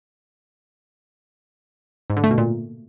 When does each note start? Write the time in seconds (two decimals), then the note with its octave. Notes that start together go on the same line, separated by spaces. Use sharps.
2.10 G#2
2.17 D3
2.24 A3
2.31 B2
2.38 A#2